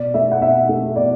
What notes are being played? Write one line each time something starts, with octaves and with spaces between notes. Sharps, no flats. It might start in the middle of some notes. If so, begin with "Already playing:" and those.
Already playing: B2 D5
A3 E5
F#5
B2 E5
A3
B2 D5